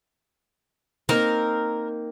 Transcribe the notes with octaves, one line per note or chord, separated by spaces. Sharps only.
A#3 C4 D#4 A#4